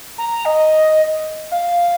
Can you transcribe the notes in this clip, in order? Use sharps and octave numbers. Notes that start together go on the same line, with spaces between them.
A#5
D#5
F5